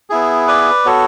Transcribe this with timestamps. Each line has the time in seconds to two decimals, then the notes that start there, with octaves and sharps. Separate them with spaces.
0.10 B3 E4 G#4
0.47 B4 D5
0.85 B3 F#4 A4 C#5